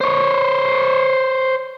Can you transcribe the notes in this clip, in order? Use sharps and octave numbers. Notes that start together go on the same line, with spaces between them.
C5 C#5